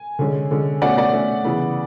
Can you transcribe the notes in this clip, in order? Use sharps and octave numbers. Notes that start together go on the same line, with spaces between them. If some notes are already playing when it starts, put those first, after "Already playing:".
Already playing: G#5
D3 G#3 C#4
D3 G#3 C#4
B2 A3 C#4 D5 F#5
D5 F#5
B2 A3 C#4
C#3 E3 B3